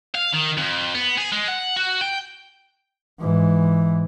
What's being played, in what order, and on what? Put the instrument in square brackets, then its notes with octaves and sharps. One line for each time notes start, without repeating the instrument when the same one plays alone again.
[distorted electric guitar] F5
D#3
F2
B3
G#4
G#3
F#5
F#4
G5
[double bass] G#2 E3